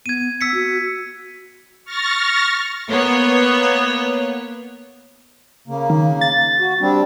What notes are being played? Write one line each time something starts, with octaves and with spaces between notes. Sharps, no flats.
B3 G#6 D#7
B3 E6 B6 C#7
F#4
C#6 F6 A6 A#6
A#3 B3 C#5
C#3 A#3
D#3
A6
F#4
G3 C4 D4